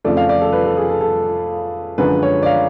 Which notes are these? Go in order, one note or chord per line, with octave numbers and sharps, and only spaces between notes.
F2 C#3 F3 A3 D5
F5
D5
A4
B4
A4
G#4
A4
A4
F#2 D3 F3 G#3 B4
C#5
D5
F5